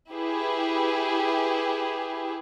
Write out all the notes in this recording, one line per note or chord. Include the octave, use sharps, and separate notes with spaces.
E4 G4 G#4 B4